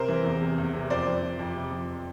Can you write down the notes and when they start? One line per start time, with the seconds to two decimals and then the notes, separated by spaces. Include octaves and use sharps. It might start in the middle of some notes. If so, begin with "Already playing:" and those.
Already playing: C3 A#4 C5
0.08 E3
0.24 E2
0.41 C3
0.58 E2
0.74 C3
0.90 F2 C5 D5
1.06 F2
1.23 F2
1.39 F2
1.56 C3
1.71 F2